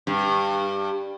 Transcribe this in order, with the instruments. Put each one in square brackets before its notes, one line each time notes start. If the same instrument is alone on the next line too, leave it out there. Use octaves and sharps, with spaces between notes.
[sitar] G2